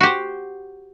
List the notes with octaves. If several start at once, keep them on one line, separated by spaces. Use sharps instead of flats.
F#4 G4 C5